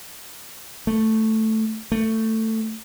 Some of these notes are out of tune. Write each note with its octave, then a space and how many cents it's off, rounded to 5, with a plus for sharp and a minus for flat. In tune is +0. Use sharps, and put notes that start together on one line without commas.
A3 +0
A3 +15